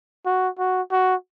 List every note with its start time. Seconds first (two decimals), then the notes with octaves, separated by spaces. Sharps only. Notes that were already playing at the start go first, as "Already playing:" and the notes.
0.26 F#4
0.59 F#4
0.92 F#4